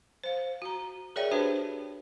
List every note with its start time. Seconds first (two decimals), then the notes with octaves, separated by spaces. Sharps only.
0.24 C5 F5
0.62 F#4 A#5
1.16 G#4 A#4 C#5 D5 E5 G5
1.31 D4 F#4 G4 B4 C5 A5